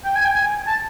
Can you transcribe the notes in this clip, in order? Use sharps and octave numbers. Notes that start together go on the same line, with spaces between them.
G5
G#5
G5
G#5
A5